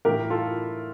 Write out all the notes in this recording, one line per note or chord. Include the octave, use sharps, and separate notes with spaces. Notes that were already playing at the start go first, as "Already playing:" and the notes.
A2 E3 G4 A#4
F4 A4